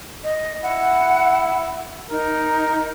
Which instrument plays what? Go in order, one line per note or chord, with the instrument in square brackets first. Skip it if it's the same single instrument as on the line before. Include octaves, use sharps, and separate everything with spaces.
[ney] D#5
[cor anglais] E4 [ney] F#5
[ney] D#4 [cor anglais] A#4